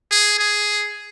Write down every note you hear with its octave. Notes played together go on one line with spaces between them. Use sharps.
G#4
G#4